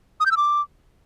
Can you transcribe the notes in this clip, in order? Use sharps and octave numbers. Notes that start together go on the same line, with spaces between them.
D#6
G6
E6
D6